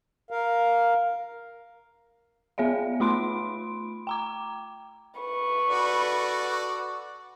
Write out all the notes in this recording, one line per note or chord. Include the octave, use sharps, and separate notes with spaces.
A#4 F5
B3 G#4 C#5 E5 F5
A3 F4 B5 C6 D7
G5 A#5 D6
B4 C#6
F#4 A4 D5